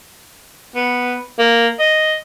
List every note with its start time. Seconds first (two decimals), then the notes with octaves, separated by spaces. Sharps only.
0.75 B3
1.39 A#3
1.79 D#5